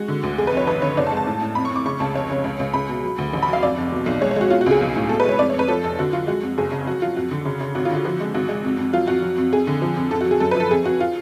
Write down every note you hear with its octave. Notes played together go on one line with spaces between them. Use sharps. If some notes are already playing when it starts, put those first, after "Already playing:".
Already playing: G#3 F#4
D3
D2
F1 G#4
B4
F1 C#5
G#1 B4
D3 C#5
F#1 D5
A5
G#3
A5
A2
A2
F2 B5
C#6
F2 D6
C#3 C#6
C#2 A5
F1 C#5
C#3
C#2
C#2
C#2 B5
B2
F#3
D2
A1
B5
F#3 F5
F2 D5
F1
B2
B1
G#3 C#5
C#5
G#3 F#4
B2 F4
F#4
C#2 G#4
B1
A2
B2 A4
B4
G#3 C#5
F2 D5
C#5
F2
B4
F3 A4
F1 A4
D3 F#4
F#3 F4
G#3 F#4
F2
F#1 G#4
C#3
F#3 F#4
F#3 F4
F2 F#4
D3
C#3
C#3
G#1 F#4
F4
D3 F#4
F3 F#4
G#3
G#1 F#4
G#3
F2
F2
F#3 F4
F2 F#4
F#3
F2
F2 G#4
D3
F3
F2
F2 A4
F#4
F#3
G#4
F#2 A4
B4
F3 A4
F2 G#4
F2 F#4
F4